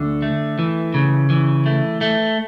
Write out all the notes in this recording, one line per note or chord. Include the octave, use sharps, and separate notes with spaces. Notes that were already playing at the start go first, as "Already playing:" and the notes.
Already playing: D2 D3
A3
E3
C#3
E3
A3
A3